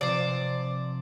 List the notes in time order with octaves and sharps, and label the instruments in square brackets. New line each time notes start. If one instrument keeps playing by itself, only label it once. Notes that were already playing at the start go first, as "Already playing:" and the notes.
[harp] C3 F3 C4 [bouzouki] C5 D5